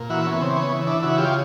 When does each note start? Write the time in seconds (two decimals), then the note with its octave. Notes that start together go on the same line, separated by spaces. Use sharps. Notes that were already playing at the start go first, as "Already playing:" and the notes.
Already playing: A#2
0.10 E3 E4 F#4
0.25 B3 C#4
0.40 C#3 C4
0.56 B3 C#4
0.72 E3
0.87 D4 E4
1.03 C#3 E4 F#4
1.18 F4 G4